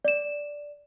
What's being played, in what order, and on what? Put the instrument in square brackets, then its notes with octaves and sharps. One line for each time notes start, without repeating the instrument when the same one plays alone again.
[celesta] D5 E7